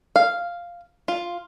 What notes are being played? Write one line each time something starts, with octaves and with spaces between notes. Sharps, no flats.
F5
F4